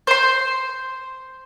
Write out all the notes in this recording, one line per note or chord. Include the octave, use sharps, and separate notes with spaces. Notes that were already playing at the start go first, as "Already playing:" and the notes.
C5 C6